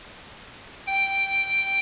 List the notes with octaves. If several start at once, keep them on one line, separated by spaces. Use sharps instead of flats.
G5